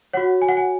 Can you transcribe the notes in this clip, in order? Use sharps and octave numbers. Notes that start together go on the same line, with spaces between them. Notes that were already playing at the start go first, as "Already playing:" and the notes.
F#4 C#5 F#5
G#5
F#5
G#5